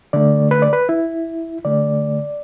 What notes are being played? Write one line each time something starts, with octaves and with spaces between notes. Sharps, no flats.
D3 A3 D5
B4
D5
B4
E4
D3 A3 D5